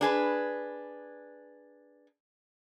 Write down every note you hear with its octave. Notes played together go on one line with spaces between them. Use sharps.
D4 G#4 B4